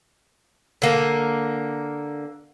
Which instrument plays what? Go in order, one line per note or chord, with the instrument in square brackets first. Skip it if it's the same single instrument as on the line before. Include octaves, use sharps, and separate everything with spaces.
[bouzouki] D3 A#3